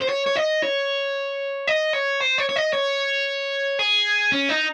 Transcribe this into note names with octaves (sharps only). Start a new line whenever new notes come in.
C5
C#5
C#5
D#5
C#5
D#5
C#5
C5
C#5
C#5
D#5
C#5
G#4
C#4
D#4